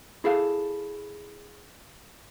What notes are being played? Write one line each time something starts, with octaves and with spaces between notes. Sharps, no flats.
E4 G#4 A4 F5